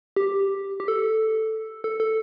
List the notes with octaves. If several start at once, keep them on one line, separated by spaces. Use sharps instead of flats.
G4
G4
A4
A4
A4